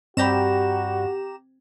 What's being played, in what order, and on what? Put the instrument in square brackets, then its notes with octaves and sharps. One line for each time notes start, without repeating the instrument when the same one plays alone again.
[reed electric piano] G2 D5 B5 [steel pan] C4 [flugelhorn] F#4 [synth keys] G4 A#5 E7